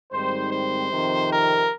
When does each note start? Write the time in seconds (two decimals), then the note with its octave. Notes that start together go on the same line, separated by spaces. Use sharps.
0.12 G#2 D#3 G3 C4 C5
0.52 C5
0.91 F2 C3 D#3
1.30 A#4